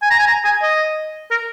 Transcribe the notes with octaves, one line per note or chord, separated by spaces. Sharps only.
G#5
A#5
G#5
A#5
G#5
D#5
A#4